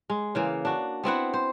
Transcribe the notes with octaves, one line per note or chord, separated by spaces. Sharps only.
G#3
C#3 E3 A#3
D4 F#4
B3 C4 E4 F#5
C5